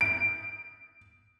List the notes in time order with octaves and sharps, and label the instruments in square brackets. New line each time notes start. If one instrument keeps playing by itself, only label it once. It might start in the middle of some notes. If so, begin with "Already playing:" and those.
[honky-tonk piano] D7